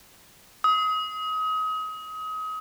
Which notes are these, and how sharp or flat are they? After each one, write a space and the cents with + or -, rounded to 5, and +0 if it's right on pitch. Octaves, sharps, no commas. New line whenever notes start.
D#6 +30